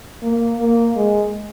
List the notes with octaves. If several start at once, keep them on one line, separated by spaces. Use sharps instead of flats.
A#3
A#3
G#3